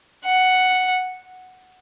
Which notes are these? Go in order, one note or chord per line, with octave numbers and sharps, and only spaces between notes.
F#5